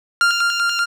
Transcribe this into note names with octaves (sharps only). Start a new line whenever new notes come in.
F6